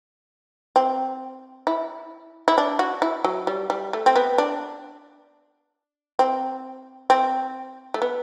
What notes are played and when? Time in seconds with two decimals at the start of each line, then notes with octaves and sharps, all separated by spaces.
0.76 C4
1.67 E4
2.48 E4
2.58 D4
2.79 F#4
3.02 E4
3.24 F#3
3.47 G3
3.70 G3
3.93 A3
4.06 C4
4.16 B3
4.38 D4
6.19 C4
7.10 C4
7.94 A3
8.02 B3